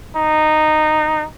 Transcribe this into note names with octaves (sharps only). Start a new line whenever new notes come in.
D#4